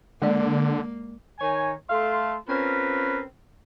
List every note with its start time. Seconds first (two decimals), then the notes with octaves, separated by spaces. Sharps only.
0.22 D3 G#3 A#3 D5
1.40 D#3 C#5 G#5
1.90 A3 A4 F5 C6
2.48 C4 C#4 F4 A#4 B4